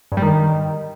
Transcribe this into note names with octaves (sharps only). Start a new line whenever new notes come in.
G2
G3
D#3